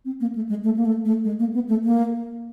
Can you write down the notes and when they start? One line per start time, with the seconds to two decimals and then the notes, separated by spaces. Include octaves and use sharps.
0.05 C4
0.20 A#3
0.35 A3
0.49 G#3
0.64 A3
0.77 A#3
0.85 A3
1.05 A3
1.24 G#3
1.39 A#3
1.54 B3
1.69 A3
1.84 A#3